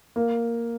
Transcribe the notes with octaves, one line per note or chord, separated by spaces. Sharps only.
A#3